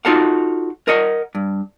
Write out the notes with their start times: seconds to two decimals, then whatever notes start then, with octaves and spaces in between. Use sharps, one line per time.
0.05 D#4 F4 F#4 A4 F5 F#5
0.88 A#4 D#5 F#5
1.35 G2